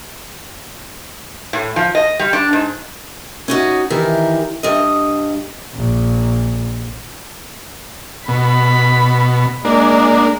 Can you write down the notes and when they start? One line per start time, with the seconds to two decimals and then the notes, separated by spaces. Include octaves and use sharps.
1.53 A2
1.76 F3
1.95 D#5
2.19 G3
2.33 D4
2.53 G#2
3.48 C#4 D#4 F#4
3.90 D#3 E3 G4 A#4
4.63 G2 D#5
5.74 A#1
8.28 B2 B5
9.65 G#3 A#3 D4